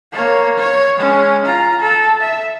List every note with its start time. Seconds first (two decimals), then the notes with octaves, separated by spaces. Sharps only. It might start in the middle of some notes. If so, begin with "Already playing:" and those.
0.12 A#3 C#5
0.57 C#5
0.97 G#3 C#4
1.45 F4 A#5
1.80 A4
2.20 E5